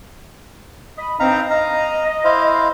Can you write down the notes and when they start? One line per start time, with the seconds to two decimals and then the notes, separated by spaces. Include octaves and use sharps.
0.97 D#5 B5
1.20 G2 C4 D#4 F5 A#5
1.50 D#5 F5 A#5
2.24 E4 C5 F5